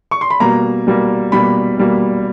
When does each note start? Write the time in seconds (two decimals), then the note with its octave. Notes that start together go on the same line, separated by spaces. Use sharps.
0.11 C#6
0.21 C6
0.30 B5
0.40 B2 G3 A#3 A#5
0.87 B2 G3 A#3
1.32 B2 G3 A#3 B5
1.78 B2 G3 A#3